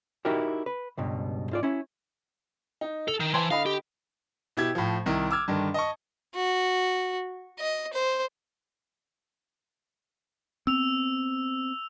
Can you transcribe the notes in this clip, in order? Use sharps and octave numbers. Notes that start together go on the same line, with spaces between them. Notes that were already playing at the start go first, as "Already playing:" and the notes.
D#4 E4 F#4 G4 A#4 E5
B4
C#2 G2 B2
G#2 F4 D5
C#4 E4
D#4
A4 F7
D#3
E3 C5 A5 C6
D3 D#5 F5 B5
G4
B2 E4 G4 G#6
A2 F3
C2 D#3 E4
D6 E6 F6 G#6
G2 D3 D#3
D#5 A5 C#6
F#4
D#5
C5
B3 C4 E6 F7